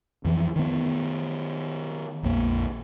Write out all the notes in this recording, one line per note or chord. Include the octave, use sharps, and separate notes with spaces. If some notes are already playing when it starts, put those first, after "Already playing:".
F2 E3 F3
D#3 B3
A#1 F2 A#3